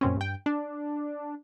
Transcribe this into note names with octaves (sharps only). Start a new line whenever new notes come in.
F#2 A#2 C4 C#4
G2 G5
D4